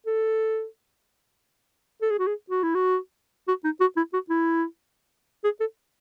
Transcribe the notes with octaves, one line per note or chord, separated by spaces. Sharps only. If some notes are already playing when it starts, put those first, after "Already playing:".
A4
A4
G#4
F#4
G#4
F#4
E4
F#4
F#4
D#4
F#4
E4
F#4
E4
G#4
A4